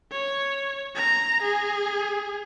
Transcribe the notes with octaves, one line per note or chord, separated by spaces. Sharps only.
C#5
A#5
G#4